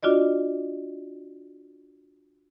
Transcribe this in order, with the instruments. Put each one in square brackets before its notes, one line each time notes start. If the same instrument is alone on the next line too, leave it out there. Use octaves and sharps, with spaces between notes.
[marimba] D4 F4 F#4 D5 D#5